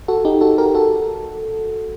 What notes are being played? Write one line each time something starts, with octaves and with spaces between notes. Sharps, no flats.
F#4 A4
D#4 G4
F#4 A4
G4 A#4
F#4 A4